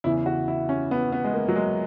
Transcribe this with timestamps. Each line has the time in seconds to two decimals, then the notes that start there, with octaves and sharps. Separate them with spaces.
0.04 E2 C#3 E3 E4
0.26 F#4
0.48 E4
0.69 C#4
0.91 B3
1.12 B3
1.24 G#3
1.34 A#3
1.49 F#3
1.55 G#3